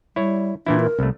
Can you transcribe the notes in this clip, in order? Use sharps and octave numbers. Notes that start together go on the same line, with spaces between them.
G3 E4 C#5
A#2 E3 D4 E4
A#4
C2 A3